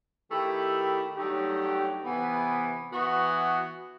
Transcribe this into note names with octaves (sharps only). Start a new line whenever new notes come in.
D#3 A3 E4 G4
G2 F#3 A3 D#4 G4
C3 E3 B3
E3 B3 F#4